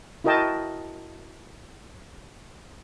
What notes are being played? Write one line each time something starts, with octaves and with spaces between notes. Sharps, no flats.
E4 F#4 A#4 D#5 G5 A5